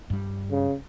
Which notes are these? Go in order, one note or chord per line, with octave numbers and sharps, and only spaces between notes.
G2 G3
C#3